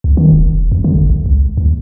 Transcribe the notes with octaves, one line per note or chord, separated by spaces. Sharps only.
C#2
D#3
E1
F1
E2
D3
G1
A#1
C#2
D#2